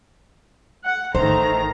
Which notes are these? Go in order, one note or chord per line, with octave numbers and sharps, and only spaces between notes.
F#5
A1 D#3 A3 C5 A#5